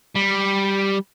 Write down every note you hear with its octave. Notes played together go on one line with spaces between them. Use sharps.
G3